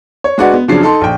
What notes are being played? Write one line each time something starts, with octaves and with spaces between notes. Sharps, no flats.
C#5
G#3 D4 F#4 B4 D5 F#5
B3
C#3 F3 F#3 D4 C7
D#4 A4 C6
A#1 G5